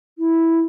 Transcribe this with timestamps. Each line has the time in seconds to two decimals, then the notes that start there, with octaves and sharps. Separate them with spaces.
0.18 E4